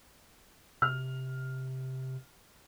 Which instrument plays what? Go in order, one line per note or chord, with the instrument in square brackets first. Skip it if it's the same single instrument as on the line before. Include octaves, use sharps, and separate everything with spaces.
[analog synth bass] C3 [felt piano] F6